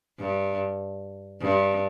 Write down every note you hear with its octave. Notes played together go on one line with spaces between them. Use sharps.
G2
G2